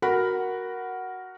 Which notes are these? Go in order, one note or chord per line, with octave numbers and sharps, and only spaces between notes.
F#4 A#4 F#5 B5